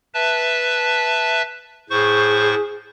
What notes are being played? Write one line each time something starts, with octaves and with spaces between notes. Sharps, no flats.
B4 E5 A5
A2 G#4 C5 C#6